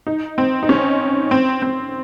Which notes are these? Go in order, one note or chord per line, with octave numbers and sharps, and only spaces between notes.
D#4
C4
D#4
C#4
C4
C4